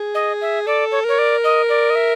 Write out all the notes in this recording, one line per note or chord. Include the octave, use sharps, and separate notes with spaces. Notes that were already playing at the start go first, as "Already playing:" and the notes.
Already playing: G#4
D#5
E5
A4 D5
C#5
A#4 C#5
D5
D#5
D5
D#5
E5